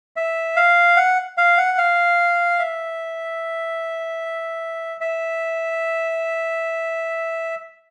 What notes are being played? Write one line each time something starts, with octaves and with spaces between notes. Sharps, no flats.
E5
F5
F#5
F5
F#5
F5
E5
E5